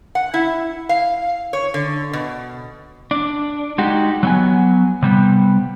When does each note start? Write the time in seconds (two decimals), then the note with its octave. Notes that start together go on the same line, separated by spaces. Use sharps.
0.15 F#5
0.34 E4
0.89 F5
1.53 C#5
1.74 D3
2.13 B2
3.11 D4
3.78 G#3 D#4 F#4 G4
4.23 F#3 B3 G#5
5.02 C3 G3 B3